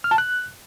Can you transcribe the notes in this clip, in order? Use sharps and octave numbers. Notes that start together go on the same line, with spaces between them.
F6
A5
F#6